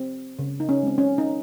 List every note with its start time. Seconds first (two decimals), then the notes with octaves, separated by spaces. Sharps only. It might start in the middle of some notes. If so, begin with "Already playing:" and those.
Already playing: C4
0.39 C#3
0.60 D#4
0.69 C#4
0.83 G#3 C4
0.98 C#4
1.18 D#4